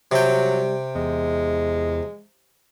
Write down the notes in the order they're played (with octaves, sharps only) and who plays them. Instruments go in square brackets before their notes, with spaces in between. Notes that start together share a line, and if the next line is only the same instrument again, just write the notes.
[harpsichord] C3 G5 [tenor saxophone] F#3 [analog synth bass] G3
[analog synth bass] E2 [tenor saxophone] G#3